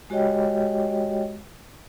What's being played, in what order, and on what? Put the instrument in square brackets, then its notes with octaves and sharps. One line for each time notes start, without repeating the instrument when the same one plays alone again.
[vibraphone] G#3 F#4 G4 C#5 D#5 G5